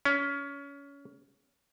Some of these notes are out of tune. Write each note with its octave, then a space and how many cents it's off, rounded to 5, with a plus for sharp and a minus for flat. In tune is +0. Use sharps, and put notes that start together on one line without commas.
C#4 +25